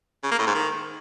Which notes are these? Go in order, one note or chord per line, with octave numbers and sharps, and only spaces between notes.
C#3
A#3
A2
G#2
D#3